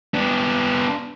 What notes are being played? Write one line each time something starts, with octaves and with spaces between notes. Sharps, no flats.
B3 D4